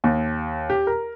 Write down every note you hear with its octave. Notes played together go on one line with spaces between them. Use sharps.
D#2
G4
A#4